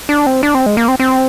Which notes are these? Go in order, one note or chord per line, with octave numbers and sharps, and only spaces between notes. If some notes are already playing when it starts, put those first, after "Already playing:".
D4
C4
D4
C4
G#3
A#3
C4
C4